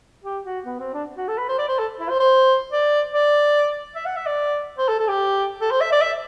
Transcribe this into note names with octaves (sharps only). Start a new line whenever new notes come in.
G4
F#4
B3
C4
D4
F#4
A4
B4
C5
D5
C5
A4
E4
C5
C5
D5
D5
E5
F#5
E5
D5
C5
A4
A4
G4
A4
C5
E5
D5
E5